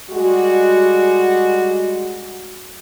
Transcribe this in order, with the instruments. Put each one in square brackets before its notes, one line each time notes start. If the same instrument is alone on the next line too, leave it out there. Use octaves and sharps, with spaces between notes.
[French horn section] G3 G#3 F#4